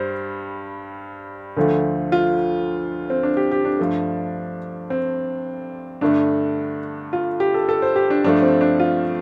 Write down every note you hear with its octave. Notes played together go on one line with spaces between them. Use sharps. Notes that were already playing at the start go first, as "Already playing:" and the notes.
Already playing: G2 G3 C5
D2 D3 F3 A3
F4
C4
D4
G4
G4
D4
G2 F3 A3
C4
G2 D3 A3 D4
F4
G4
A4
A4
C5
G4
D4
G2 F3 A3 D4
C4
D4
F4